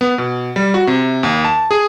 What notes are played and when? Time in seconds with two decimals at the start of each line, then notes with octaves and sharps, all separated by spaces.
0.01 B3
0.18 B2
0.56 G3
0.74 F#4
0.87 C3
1.23 D#2
1.45 A5
1.71 G#4